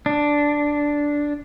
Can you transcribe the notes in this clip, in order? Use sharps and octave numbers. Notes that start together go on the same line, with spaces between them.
D4